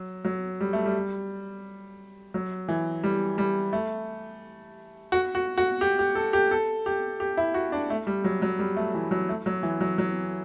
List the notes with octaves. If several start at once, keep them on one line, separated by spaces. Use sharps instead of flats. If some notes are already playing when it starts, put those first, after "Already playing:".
Already playing: F#3
F#3
G3
A3
G3
F#3
E3
G3
G3
A3
F#4
F#4
F#4
G4
G4
A4
G4
A4
G4
G4
E4
F#4
D4
A3
G3
F#3
F#3
G3
A3
E3
F#3
A3
F#3
E3
F#3
F#3